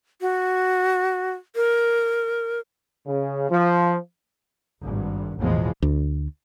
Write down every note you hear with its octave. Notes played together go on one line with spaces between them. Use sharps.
F#4
A#4
C#3
F3
G#1 G2
A1 E2 B2 E3 F3 G#3
D2